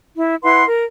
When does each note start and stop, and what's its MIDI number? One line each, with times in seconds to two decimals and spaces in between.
0.17 0.35 64
0.43 0.64 64
0.43 0.64 71
0.43 0.64 78
0.43 0.64 84
0.66 0.85 70